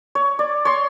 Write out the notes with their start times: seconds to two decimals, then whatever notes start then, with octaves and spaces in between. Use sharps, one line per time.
0.15 C#5
0.39 D5
0.65 C#5 C6